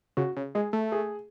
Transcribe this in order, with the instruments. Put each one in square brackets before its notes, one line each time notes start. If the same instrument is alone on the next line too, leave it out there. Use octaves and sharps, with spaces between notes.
[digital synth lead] C#3 [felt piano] F#4
[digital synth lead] C#3
[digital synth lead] G#3 [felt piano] G#4
[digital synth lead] A3
[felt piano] G#4